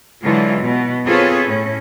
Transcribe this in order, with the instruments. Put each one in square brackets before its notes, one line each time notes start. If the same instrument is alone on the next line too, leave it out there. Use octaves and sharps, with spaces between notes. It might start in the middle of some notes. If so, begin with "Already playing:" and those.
[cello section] D3 E3 F#3 G#3 F4
B2
C4 F4 G#4 A4 B4 C#5
A2 C#4